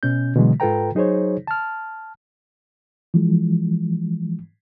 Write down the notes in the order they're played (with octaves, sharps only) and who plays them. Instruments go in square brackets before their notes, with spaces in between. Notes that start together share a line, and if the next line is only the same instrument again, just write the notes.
[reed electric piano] B2 C#4 G6
B2 D3 E3 F#3 G#3
G#2 F4 A4 B4 G5 A#5
F#3 D#4 G#4 C5 C#5
A5 F6
E3 F3 G#3